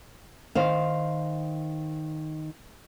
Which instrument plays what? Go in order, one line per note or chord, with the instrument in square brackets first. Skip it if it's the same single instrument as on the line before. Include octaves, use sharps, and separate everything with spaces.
[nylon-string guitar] D#3 C5 F5